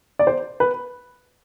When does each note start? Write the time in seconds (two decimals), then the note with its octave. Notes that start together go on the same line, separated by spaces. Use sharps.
0.19 D5
0.27 C5
0.60 B4